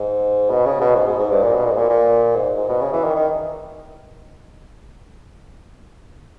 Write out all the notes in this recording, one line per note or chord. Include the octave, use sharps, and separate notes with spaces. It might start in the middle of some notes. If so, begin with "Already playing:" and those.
Already playing: G#2
B2
C#3
B2
G#2
G#2
G#2
G2
A#2
B2
A#2
G#2
A#2
A#2
G#2
G#2
B2
C#3
E3
D#3
D#3